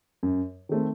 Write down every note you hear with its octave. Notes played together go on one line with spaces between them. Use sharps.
F#2
D#3 A3 C4